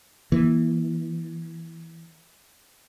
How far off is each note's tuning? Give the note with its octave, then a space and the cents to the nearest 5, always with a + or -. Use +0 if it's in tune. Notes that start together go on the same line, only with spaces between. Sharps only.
E3 +0 A#3 +40